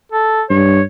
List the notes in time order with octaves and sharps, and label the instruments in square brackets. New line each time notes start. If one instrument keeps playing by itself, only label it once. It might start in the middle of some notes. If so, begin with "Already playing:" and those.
[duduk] A4
[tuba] G2 [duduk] C#5